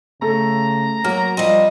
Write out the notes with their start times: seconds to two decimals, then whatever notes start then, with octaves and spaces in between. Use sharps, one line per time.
0.22 C#3 A3 A4 A#5
1.04 F#3 A#3 F6
1.37 F3 G3 C4 D#5